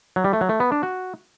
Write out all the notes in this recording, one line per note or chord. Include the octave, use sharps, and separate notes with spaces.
F#3
G3
A3
F#3
A3
B3
D4
F#4